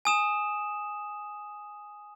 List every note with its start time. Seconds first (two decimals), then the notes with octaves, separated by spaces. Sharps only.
0.05 G#5 D#6 E7